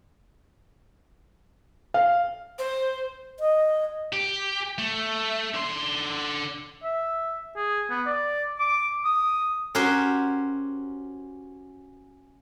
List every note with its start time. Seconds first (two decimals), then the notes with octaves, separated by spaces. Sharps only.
1.94 F5
2.59 C5
3.40 D#5
4.13 G4
4.78 A3
5.54 D3 C6
6.83 E5
7.56 G#4
7.90 B3
8.06 D5
8.59 D6
9.05 D#6
9.75 C#4 F#4 G4 A#4 C5 C6